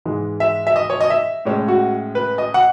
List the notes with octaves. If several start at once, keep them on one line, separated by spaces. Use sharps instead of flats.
G#2 E3 G#3
E5
E5
D#5
C#5
D#5
E5
A2 G#3 C#4
F#4
B4
D#5
F#5